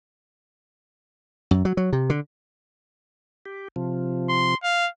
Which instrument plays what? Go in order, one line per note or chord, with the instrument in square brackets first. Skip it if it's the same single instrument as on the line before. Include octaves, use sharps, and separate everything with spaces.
[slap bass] F#2
F#3
F#3
C3
D3
[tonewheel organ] G4
C3 F3
[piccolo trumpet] C6
F5